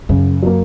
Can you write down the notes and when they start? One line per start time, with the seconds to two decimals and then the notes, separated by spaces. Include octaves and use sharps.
0.09 F#2 C#3
0.42 F#3 A#3